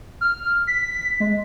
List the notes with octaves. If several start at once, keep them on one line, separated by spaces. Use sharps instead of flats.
F6
B6
G#3